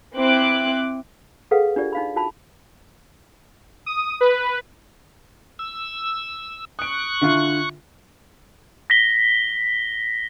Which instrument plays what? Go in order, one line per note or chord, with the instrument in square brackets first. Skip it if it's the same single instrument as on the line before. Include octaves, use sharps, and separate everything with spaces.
[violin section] C4 E4 D6 F#6
[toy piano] G#4 A4 B4 F5 F#5
D4 F4 G4 D5
D#4 F5 B5
F4 F#4 A5 B5
[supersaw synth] D#6
B4
[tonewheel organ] E6
[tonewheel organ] C#6 F#6 [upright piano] D#6 D7
[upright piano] D3 E4 F4
[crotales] A#6 B6 G7